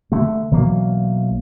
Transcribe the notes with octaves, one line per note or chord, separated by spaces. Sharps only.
D3 A3
B1 E3 F#3 A#3